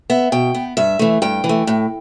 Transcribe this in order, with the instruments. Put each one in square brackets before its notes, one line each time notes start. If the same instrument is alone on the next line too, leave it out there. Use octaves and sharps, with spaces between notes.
[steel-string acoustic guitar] B3 E5
B2 G5
B3
G2 E5
E3 A3
G2 G5
E3
A3
A2